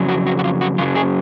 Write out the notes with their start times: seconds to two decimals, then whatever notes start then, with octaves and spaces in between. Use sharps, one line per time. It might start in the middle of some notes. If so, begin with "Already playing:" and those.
Already playing: F2 C#3 F#3
0.09 F#4
0.27 F#4
0.39 F#4
0.44 F4
0.61 F#4
0.78 F#2 C#3 F#3 F4
0.95 G#4